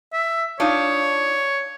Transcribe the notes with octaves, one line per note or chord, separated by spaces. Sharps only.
E5
D4 D#4 F4 C#5